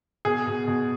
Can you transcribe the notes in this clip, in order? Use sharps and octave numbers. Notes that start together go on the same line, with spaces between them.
B2 G#4
B2
B2